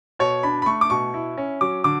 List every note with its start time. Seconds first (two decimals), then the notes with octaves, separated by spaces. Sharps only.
0.19 B2 C#5
0.43 D4 B5
0.62 B5
0.66 A3 C#6
0.81 D6
0.90 B2 C#6
1.14 E4
1.38 C#4
1.61 F#3 D6
1.84 D3 D6